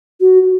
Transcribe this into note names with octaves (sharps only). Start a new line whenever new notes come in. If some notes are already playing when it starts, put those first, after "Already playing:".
F#4